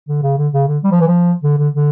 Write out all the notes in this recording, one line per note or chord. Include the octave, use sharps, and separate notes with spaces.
D3
C#3
D3
C#3
D3
G3
F3
E3
F3
D3
D3
D3